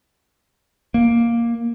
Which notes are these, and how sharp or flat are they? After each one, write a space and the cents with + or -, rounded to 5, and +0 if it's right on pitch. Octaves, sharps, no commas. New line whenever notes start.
A#3 +5